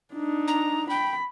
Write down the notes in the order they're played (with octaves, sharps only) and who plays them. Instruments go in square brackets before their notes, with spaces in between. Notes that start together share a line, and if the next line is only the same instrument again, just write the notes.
[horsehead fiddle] D4 D#4
[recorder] A#5
[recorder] G5 [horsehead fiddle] B5